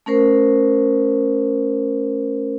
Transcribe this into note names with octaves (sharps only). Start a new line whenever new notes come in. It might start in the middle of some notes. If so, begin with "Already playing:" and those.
A3 C#4 A#4 C5